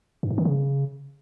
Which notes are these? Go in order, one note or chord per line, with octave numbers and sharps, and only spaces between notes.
G2
G#2
D#3
C#3